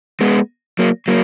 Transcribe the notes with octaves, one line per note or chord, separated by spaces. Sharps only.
G#3 B3
F#3 A#3
F#3 A#3